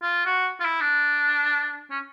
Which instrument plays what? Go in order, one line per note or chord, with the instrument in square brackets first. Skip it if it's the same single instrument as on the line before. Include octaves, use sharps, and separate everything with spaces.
[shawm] F4
F#4
F4
E4
D4
C#4